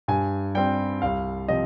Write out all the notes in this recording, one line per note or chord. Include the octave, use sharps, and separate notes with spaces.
G2 G#5
G3 C4 G5
C2 F5
C3 F3 C4 D#5